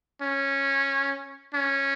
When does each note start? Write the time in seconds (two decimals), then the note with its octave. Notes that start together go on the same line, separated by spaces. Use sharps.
0.22 C#4
1.55 C#4